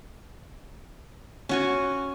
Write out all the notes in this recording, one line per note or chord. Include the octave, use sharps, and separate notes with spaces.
C#4 F#4 G#5